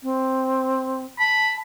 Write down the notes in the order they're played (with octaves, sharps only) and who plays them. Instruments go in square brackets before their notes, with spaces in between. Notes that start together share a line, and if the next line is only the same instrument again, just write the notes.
[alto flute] C4
[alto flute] A5 [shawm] B5